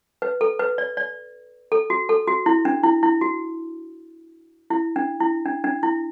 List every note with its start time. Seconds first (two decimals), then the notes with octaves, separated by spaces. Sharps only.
0.22 B4
0.41 A4
0.59 B4
0.78 D5
0.97 D5
1.72 A4
1.90 F#4
2.09 A4
2.27 F#4
2.46 E4
2.65 D4
2.83 E4
3.03 E4
3.21 F#4
4.70 E4
4.96 D4
5.20 E4
5.46 D4
5.64 D4
5.83 E4